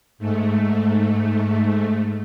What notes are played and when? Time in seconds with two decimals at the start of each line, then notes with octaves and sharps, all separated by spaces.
0.18 G#2 A3